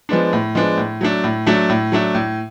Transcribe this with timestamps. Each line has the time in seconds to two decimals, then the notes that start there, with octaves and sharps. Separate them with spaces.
0.09 F3 G#3 B3 D4
0.33 A2
0.55 F3 G#3 B3 D4
0.77 A2
1.01 F#3 A3 D4
1.24 A2
1.46 F#3 A3 D4
1.70 A2
1.92 F#3 A3 D4
2.15 A2